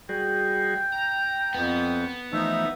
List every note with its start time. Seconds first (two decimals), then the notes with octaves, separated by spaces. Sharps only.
0.09 G3 F#4 G#4 G5
0.92 A#5
1.55 F2 B3
2.33 E3 F3 A3 D#4 E5